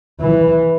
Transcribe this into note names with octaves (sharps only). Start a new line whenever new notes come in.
E3